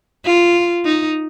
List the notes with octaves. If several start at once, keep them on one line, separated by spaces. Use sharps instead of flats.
F4
D#4